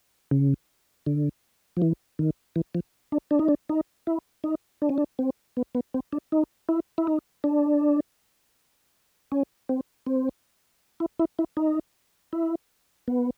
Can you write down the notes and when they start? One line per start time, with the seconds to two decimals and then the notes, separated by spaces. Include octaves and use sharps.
0.31 C#3
1.06 D3
1.77 F3
1.82 E3
2.19 D#3
2.56 E3
2.75 F3
3.12 D4
3.31 D4
3.39 D#4
3.48 D4
3.69 D#4
4.07 E4
4.44 D#4
4.82 D4
4.89 C#4
4.98 D4
5.19 C4
5.57 B3
5.75 B3
5.94 C4
6.13 D4
6.32 D#4
6.69 E4
6.98 E4
7.07 D#4
7.44 D4
9.32 C#4
9.69 C4
10.06 C4
11.00 E4
11.19 E4
11.39 E4
11.57 D#4
12.33 E4
13.08 B3